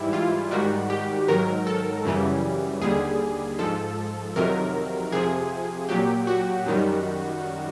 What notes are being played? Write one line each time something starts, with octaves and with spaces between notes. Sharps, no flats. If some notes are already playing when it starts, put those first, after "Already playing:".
Already playing: G#2 E3 G3 E4
F4
G#2 D#3 G3 F#4
G4
G#2 D#3 F#3 A#4
A4
F#2 C#3 E3 G3
D#2 D3 G3 G#4
G#2 F3 A4
F2 C3 D#3 F#3 A#4
F2 C3 F3 G#4
A#2 F#3 G4
F#4
F#2 D#3 G3